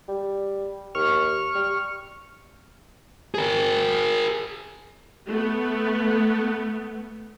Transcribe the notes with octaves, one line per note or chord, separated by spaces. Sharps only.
G3
D#2 C#6 F6
G3
G#4 A#4
A3 B3